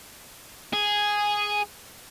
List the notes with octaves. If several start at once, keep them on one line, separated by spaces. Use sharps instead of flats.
G#4